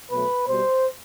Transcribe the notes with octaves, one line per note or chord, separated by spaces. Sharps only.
B2 F#3 A3 B4
B2 G3 C5